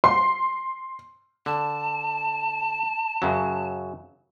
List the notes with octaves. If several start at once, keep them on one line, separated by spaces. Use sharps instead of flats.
C6
D3 A5
F#2 C#3 F#3